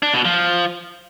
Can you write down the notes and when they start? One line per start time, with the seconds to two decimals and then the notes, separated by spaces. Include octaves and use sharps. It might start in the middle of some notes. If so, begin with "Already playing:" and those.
0.02 D4
0.14 B2
0.25 F3